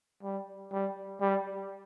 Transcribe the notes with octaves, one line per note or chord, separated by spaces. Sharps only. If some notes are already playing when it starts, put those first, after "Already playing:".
G3
G3
G3